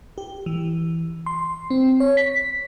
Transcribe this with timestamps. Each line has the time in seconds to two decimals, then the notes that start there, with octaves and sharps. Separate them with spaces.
0.18 G4
0.46 E3
1.26 C6
1.70 C4
2.00 C#5
2.17 B6